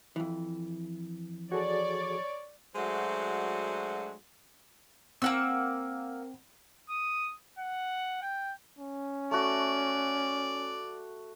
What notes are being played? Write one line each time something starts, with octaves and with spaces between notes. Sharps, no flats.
F2 E3
F#4 G#4 A4 C#5 D5
F#3 G#3 A3 D4 F#4 C5
A#3 C4 F#5 E6
D#6
F#5
G5
C#4
A3 F#4 D5